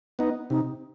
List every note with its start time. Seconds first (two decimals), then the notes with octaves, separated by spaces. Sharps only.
0.19 B3 D#4
0.50 C3 D#4